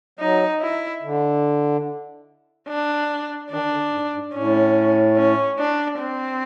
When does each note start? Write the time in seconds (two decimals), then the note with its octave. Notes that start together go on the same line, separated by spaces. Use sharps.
0.19 F#3 D#4
0.61 E4
1.02 D3
2.68 D4
3.50 D#3 D4
3.72 D3
3.92 G#2
4.13 G#2
4.34 A2 C#4
5.17 C#4
5.59 D4
6.00 C4